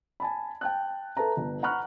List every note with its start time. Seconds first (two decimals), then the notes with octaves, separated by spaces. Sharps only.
0.20 G#5 A5 B5
0.61 G5 A5 F#6
1.17 A4 B4 E5 A5 A#5
1.37 G1
1.63 F#5 A#5 B5 C#6 F6 F#6